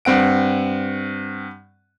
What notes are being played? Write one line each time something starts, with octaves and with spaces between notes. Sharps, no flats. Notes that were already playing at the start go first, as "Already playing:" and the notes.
G2 C4 F#5 D7